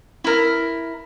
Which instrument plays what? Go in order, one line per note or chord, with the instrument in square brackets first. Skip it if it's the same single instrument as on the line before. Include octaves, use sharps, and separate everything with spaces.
[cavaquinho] E4 A#4